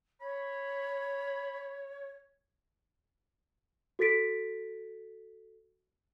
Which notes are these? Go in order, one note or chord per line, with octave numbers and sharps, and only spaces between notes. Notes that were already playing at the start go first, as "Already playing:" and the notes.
C#5 B5
F#4 A4 A6 B6 D7